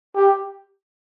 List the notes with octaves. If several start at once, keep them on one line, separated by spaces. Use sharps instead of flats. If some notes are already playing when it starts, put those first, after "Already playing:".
G4